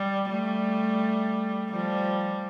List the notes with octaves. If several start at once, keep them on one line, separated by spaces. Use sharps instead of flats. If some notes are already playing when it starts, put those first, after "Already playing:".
Already playing: G3
G3 A3
F3 G3